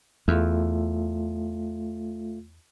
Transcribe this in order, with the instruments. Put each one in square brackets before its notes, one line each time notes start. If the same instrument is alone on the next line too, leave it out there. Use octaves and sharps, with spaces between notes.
[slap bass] E2 [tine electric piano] A3 F4